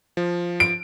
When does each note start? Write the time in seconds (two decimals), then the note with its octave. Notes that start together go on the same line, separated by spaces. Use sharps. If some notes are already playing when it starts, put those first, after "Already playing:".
0.17 F3
0.60 D7